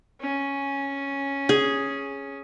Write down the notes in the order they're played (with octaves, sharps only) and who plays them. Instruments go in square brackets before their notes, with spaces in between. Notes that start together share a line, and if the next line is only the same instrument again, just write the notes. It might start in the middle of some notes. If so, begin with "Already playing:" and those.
[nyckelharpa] C#4
[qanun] G#4